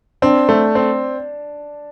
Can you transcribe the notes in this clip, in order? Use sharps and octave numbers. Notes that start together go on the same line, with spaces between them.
C4 D4
A3
C4